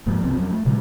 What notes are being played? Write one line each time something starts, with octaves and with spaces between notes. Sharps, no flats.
F2 G#2 F3 A#3
F#1 C2 E3 C4
F2 F#3
A3
A#2 C#3 F#3 G#3